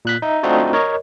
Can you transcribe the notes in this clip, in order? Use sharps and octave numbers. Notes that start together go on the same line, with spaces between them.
A#2 F#6 B6
D#4 E5
A3 C4 D4 D#4 F4 F#4
A#4 C#5 D#5